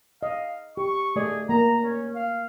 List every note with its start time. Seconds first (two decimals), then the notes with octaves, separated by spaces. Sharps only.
0.23 D#5 F5
0.77 G4 C#6
1.16 A3 G#4 D5 D#5
1.49 A#3 A#5
1.84 C#4
2.16 F5